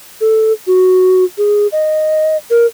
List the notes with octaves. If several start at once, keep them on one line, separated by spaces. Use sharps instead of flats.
A4
F#4
G#4
D#5
A#4